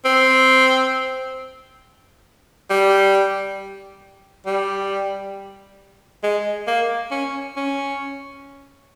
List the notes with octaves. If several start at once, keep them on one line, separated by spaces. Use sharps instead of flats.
C4
G3
G3
G#3
A#3
C#4
C#4